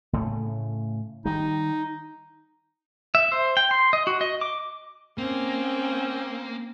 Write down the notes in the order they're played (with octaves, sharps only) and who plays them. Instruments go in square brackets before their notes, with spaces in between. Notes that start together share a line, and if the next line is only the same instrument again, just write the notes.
[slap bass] A2 C#3 A3
[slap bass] D#3 G3 [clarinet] D#4
[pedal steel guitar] E5
C5
G5
C6
D#5
F#4
D#5
D6
[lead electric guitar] A#3 [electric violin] C4 C#4